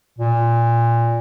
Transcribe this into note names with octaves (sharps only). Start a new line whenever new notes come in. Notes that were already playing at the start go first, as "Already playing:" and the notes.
A#2